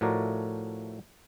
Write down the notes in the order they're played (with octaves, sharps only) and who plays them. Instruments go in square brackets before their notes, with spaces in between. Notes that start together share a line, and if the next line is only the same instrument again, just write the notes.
[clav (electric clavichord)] A2 F3 A3 F#4 A#4 D5